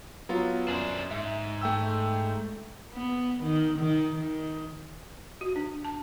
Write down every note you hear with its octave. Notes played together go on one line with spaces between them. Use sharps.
F#3 B3 F4
F#2 D4 C5
G#2 E5
A3 G5 E6
B3
D#3
D#3
D#3
F#4
D4
A5